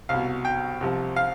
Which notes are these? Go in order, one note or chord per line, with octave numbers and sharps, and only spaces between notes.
C2 B2 F5
G5
C2 C3 F3
F5